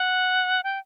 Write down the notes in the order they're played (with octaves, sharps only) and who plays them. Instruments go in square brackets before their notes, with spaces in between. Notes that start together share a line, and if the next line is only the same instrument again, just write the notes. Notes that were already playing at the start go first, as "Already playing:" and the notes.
Already playing: [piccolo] F#5
G5